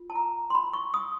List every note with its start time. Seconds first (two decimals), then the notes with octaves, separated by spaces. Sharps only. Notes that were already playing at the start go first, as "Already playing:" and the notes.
Already playing: F4
0.10 A5
0.15 A#5
0.50 C6
0.55 B5
0.73 C#6
0.94 D#6